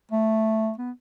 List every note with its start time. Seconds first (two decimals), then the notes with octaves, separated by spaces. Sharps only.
0.11 A3
0.78 B3